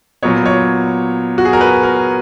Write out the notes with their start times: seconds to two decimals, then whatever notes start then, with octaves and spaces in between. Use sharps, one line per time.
0.23 A#2 F#3 B3 C#5
0.46 C#5
1.38 F#4
1.45 G#4
1.53 A#4
1.61 B4
1.83 A#4